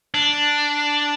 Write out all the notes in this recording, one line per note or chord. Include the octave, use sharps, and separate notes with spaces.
D4